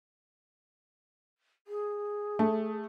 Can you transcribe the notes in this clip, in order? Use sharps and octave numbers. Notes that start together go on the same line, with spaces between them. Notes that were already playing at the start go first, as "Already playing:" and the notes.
G#4
A3